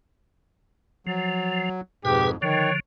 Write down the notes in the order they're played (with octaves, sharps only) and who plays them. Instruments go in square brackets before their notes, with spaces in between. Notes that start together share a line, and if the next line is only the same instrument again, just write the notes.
[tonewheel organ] F3 [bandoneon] F#3
[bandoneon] F2 G#2 [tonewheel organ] B2 G#4 B4 [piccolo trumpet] G4
[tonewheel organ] D3 F3 [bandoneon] D#3 [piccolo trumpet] C#5